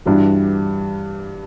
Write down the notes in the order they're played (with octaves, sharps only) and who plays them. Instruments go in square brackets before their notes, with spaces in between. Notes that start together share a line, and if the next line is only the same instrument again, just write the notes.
[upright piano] G2 E3 G3 D4 F#4